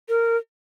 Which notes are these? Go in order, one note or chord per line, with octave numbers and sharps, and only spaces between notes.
A#4